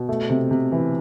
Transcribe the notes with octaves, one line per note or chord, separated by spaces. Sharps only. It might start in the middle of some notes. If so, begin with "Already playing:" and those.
Already playing: B2
A3
C3
C3
E3